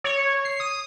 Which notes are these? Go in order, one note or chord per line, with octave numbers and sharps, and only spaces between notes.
C#5
C7
D#6